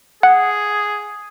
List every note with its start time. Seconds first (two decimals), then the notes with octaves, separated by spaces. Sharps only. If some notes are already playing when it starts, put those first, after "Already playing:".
0.23 G#4 F#5